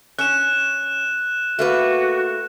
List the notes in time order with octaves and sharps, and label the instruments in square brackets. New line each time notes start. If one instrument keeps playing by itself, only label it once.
[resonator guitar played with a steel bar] C#4 [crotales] F#6 E7
[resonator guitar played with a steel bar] A3 A#3 B4 [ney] F#4